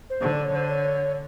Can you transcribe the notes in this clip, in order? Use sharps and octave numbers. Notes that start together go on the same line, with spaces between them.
C5
D3
D5
C#5
D3 C5
C#5